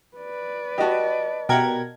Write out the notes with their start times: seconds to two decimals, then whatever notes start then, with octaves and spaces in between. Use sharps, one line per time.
0.17 B4 D5
0.78 F#4 G4 D#5 A5
1.49 B2 G4 A#4 F#5 G5 G#6